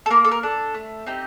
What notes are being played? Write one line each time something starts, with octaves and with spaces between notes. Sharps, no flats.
A4
A#3 A#4
A4
A#4
D4 A4
A3
C4 D#4 G4